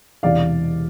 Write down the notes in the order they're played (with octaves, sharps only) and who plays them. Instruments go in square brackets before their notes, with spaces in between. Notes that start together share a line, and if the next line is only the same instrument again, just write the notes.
[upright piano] E1 E2 C3 E3 D5 F5